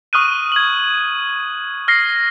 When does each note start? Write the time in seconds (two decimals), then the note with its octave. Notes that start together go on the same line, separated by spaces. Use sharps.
0.13 C#6 D#6 F6 F#6 D#7
0.52 G#6 F#7
1.88 F6 A#6 C7